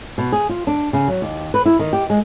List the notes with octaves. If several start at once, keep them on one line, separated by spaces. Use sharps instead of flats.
B2
G#4
F4
D4
C#3
F#3
D#2
B4
E4
D#3
G4
G#3